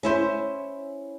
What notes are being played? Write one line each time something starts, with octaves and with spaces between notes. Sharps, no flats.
C#4 E4 C5